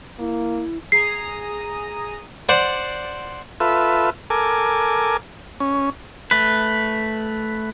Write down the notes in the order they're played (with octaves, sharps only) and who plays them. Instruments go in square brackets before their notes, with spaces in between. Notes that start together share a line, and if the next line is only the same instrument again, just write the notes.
[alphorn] A#3 [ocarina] E4
[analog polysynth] G#4 A#5 D#6 [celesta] C7
[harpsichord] C5 D5 F#5
[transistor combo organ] F4 A4 B4 E5
A4 A#4 G#5 D6
C#4
[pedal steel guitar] A3 B4